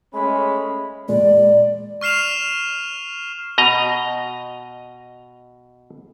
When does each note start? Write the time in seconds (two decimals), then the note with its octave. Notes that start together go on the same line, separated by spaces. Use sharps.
0.14 G#3 A3 C#4 B5
1.08 E2 A#2 G#3 D5
2.01 C#6 F6 C7 E7 F7
3.58 B2 D#5 A#5